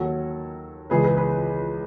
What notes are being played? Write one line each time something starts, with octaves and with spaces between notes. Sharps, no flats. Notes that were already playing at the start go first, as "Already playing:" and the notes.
Already playing: D#2 D#3 F#3 F#4 A4
C#2 C#3 E3 G#4 B4
G#4 B4
G#4 B4